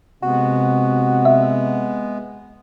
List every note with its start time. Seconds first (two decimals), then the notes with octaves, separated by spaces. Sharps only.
0.23 C3 G#3 B3 F#4
1.25 E5